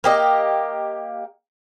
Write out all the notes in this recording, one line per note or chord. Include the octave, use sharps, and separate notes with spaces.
A#3 G4 D#5